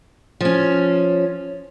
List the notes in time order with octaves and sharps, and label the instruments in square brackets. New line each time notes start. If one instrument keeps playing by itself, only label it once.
[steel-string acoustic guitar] F3 C#4